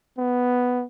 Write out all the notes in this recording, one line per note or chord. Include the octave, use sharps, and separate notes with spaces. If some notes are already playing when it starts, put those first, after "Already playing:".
B3